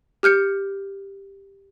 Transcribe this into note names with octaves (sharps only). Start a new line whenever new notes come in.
G4 F6 G6 C#7